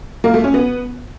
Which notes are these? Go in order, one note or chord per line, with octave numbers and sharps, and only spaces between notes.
A#3
A3
C#4
B3